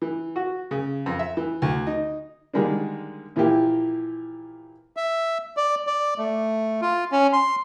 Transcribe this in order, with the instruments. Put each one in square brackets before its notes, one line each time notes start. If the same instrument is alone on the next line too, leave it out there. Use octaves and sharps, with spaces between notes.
[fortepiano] E3
F#4
C#3
F2
E5
E3
D2
D#4
D3 D#3 G3 G#3 A#3 D4
A#2 E3 F3 A#3 E4 G4
[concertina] E5
D5
D5
A3
F4
C#4
C6